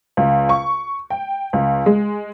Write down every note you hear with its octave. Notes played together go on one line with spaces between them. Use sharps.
C#2
C#6
G5
C#2
G#3